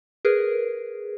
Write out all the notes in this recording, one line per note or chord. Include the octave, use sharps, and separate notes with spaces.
G#4 A#4 B4